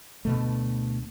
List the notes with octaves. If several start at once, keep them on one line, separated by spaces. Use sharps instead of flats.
D2 B2 A3